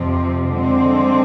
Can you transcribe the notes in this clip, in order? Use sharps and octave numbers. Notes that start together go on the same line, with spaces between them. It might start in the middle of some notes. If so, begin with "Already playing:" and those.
Already playing: F2 C3 F3 C4
D3 G#3 C4